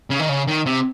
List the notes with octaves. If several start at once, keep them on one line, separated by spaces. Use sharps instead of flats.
C#3
D#3
C#3
D#3
C3